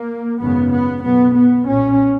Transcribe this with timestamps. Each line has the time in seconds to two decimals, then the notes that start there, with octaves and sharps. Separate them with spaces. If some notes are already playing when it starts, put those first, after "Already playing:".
Already playing: A#3
0.40 G#1 F#2 C#3 B3
0.72 B3
1.04 B1 B2 B3
1.36 B3
1.68 B1 A#2 C#4